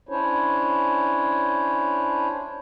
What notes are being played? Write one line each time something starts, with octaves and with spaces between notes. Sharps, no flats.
C#4 D4 E4 C5 C#5